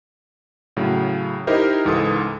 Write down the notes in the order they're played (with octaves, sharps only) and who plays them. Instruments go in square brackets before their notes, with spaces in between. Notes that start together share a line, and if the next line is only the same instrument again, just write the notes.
[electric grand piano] A2 C#3 F#3
D#4 E4 G4 A#4 C5
C#2 G#2 E3 A4 D#6